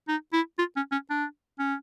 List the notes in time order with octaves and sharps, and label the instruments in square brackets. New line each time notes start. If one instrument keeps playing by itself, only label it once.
[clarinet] D#4
E4
F4
C#4
C#4
D4
C#4